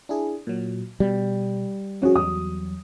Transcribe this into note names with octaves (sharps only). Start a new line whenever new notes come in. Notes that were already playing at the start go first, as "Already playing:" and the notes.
D4 E4 G#4
A#2 F#3
B2 G3
F3 C#4 F#4 G#4
E2 F#3 D#6